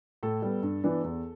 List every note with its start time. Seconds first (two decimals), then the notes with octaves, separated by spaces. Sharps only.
0.23 A2 A4
0.42 G3 B3
0.63 G2
0.84 E3 B3 D4
1.04 E2